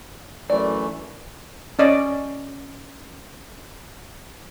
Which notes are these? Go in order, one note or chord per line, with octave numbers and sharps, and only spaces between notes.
F#2 E3 A3 D5
C#4 D5 D#5